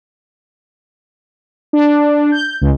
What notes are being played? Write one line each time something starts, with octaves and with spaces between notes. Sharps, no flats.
D4
G6
C#2